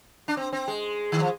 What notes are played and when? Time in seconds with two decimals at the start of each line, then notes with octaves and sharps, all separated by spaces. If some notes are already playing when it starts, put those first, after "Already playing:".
0.28 D4
0.37 C4
0.53 C4
0.68 G#3
1.12 D#3
1.21 F3